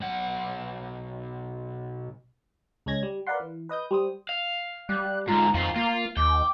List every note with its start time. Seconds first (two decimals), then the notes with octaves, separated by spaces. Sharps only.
0.01 B1 F#5
2.86 C#2 G#3 C#4 G#6 A#6
3.03 G3
3.27 A#4 B4 D5 F5 F#5 C6
3.40 E3
3.69 B4 D#5 D#6 G6
3.91 G3 C5 D#6
4.29 F5
4.89 G3 F#6
5.28 G#2 D3 F4 A#5
5.54 F2 D#3 F4 F5
5.76 A#3 F4
6.17 D#2 G5 D6